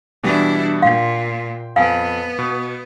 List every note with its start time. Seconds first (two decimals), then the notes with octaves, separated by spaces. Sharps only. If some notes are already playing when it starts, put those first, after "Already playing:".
0.23 B2 E3 G3 D4 E4
0.82 A#2 F5 G5 C6
1.76 F2 B3 F5 G#5
2.39 B2